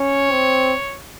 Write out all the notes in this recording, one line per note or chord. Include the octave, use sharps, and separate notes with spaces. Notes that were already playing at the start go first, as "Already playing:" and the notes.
Already playing: C#4 C#5
C4